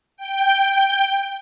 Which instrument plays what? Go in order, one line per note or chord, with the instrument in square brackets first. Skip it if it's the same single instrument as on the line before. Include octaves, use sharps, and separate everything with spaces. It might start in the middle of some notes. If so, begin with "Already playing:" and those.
[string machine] G5